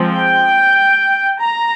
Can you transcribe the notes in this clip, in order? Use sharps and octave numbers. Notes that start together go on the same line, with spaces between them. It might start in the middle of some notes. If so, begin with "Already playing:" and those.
Already playing: F3 G#3 C4
G5
A#5